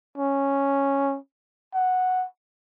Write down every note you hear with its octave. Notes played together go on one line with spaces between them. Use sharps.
C#4
F#5